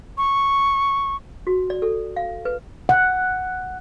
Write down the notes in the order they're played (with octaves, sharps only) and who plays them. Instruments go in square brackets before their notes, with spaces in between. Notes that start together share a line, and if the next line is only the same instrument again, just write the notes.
[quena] C#6
[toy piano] F#4
D5
A4
F5
B4
[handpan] F#5